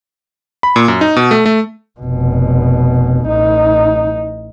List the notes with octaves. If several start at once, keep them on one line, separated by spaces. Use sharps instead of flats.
B5
A#2
F#2
D#4
B2
A3
A3
F1 B2
A1 D#4